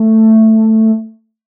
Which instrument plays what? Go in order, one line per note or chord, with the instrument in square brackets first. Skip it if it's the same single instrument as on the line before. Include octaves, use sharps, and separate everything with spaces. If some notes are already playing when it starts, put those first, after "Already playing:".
Already playing: [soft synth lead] A3